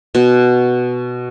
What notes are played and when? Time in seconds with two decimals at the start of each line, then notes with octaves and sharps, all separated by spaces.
0.15 B2